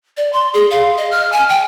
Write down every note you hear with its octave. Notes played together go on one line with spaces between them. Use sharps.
D5
C6
G#4
F5
D#5
F6
G#5
G5